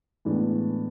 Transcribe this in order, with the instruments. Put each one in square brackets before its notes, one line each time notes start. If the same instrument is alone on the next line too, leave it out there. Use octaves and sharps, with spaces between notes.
[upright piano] A2 E3 G#3 B3 D4